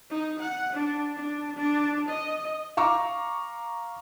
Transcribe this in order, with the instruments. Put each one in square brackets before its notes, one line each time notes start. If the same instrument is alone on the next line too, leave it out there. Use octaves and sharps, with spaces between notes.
[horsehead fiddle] D#4
F#5
D4
D4
D4
D#5
[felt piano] F5 A#5 C#6 D6